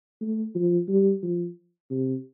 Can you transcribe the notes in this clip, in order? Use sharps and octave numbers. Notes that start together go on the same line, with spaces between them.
A3
F3
G3
F3
C3